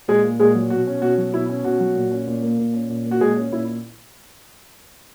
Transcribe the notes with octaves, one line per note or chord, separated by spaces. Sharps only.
A#2 G#3 G#4
A#3
A#2 G#3 G#4
F#3
B2 F#4
C#4
B2 F#4
F#3
B2 E4
C#4
B2 F#4
F#3
A#2
C#4
A#2
A#3
A#2
C#4
A#2
A#3
F#4
A#2 G#3 G#4
C#4
A#2 E4